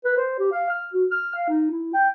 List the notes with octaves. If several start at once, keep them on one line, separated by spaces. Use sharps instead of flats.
B4
C5
G4
F5
F6
F#4
F6
F5
D#4
E4
G5